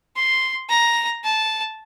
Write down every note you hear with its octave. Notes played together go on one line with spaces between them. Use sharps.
C6
A#5
A5